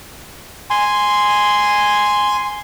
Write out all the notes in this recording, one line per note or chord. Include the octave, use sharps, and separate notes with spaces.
G#5 C6